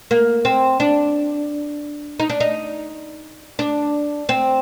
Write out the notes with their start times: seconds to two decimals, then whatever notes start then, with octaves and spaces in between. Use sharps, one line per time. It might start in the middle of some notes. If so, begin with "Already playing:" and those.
0.11 A#3
0.45 C4
0.80 D4
2.20 D#4
2.29 D4
2.40 D#4
3.59 D4
4.29 C4